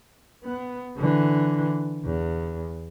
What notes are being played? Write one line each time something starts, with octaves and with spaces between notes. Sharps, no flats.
B3
D3 E3
E2